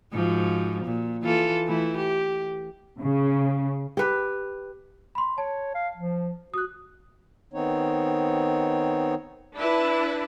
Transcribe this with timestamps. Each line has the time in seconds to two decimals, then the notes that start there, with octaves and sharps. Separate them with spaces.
0.13 G#2 F3 F#4
0.85 A#2
1.22 E3 F4 A4
1.67 E3 A3 E4
1.97 G4
3.00 C#3
3.97 G4 B4
5.15 B5 C6
5.38 C#5 A5
5.74 F5
5.97 F3
6.54 F#4 D#6 F#6
7.54 D#3 B3 C4 D#4 C#5
9.54 D4 E4 B4